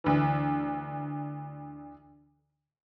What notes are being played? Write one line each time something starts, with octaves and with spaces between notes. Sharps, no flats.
D2 E3